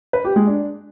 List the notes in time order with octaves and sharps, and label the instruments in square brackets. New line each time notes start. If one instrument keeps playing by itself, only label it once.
[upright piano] B4
G4
G#3
D4